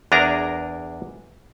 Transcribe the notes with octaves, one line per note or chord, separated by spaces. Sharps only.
E2 D4 G#4 A#4 A#5